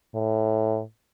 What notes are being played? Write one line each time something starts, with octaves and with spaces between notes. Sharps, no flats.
A2